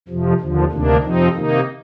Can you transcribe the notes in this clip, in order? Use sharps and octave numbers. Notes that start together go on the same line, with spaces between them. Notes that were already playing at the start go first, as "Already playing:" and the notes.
F2 C3 F3
D#2 D3 F3
D2 C3 D#3 A#3 D4
F2 C3 F3 C4 D#4
C3 D#3 A#3 D#4